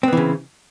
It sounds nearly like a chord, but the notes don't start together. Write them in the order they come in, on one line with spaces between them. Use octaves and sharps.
C4 B3 E3 C#3